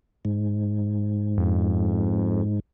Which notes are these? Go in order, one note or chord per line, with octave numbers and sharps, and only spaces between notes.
G#2
F2